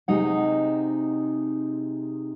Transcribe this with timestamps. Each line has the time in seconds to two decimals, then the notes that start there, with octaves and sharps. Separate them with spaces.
0.08 C3 G#3 D#4 F#5